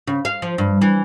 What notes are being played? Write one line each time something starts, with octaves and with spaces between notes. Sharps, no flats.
C#3
F5
F3
G2
E3